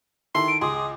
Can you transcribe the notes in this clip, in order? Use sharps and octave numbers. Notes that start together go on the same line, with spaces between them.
D#3 E4 A4 C6
D7
C#2 G#4 C6 D6 D#6